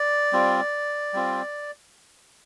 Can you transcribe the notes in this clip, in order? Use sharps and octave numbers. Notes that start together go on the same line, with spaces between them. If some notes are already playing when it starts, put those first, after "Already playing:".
Already playing: D5
G3 C4 F4
G3 C4 F4